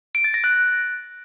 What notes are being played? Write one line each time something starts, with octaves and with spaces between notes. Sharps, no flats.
D7
A6
A#6
F#6